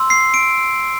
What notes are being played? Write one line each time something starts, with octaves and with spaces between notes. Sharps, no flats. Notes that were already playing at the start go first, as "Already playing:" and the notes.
Already playing: C6 E6
C7
D7